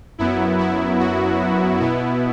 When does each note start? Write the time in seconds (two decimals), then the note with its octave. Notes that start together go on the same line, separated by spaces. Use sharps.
0.18 F#2 F#3 B3 E4
0.59 E4
0.99 F#4
1.80 B2 B3 E4